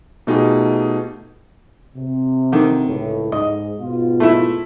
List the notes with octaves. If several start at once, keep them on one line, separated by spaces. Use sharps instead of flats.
B2 A3 D#4 F4 G4 G#4
C3
D3 D#3
C#2 A2
G#2 D#5
G#2 B2 F4
A3 E4